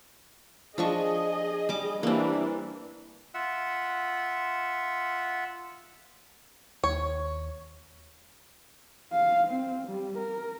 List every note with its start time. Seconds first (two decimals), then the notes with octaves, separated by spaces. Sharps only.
0.78 F3 D4 G#4 D#5 C#6
1.69 G3 D6
2.03 E3 G3 A#3 C4 D4
3.34 F4 E5 F#5
6.84 D#2 C#5
9.13 F5
9.48 C4
9.88 G3
10.18 A#4